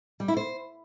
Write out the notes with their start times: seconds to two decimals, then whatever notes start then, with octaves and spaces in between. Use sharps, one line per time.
0.20 G3
0.28 E4
0.37 C5